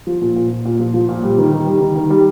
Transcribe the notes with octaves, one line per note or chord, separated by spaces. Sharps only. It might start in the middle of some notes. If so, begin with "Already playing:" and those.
F3
A#2
A#2
A#2
A#2
F3
F3
A#2
G3
D#3
D#3
G3
D#3
D#3
G3